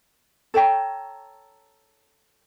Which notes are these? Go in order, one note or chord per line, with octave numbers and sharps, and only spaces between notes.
A4 C#5 G5 A#5